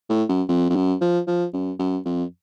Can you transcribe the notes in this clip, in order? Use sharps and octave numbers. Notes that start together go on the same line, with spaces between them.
A2
F#2
F2
F2
F#2
F3
F3
F#2
F#2
F2